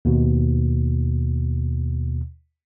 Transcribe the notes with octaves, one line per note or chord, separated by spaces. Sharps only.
D#2 B2